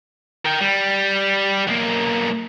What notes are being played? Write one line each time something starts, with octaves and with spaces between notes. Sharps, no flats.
A#4 G5
G3
B1 A#3